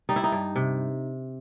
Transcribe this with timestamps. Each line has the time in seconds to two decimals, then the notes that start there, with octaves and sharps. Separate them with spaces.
0.09 G3 D#4
0.16 E4
0.24 D#4
0.32 G2
0.56 C3